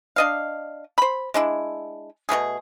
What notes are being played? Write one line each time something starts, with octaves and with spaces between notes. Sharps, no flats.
D4 D#5 F5
C5 B5
G#3 D4 E4
B2 F#3 A3 G#4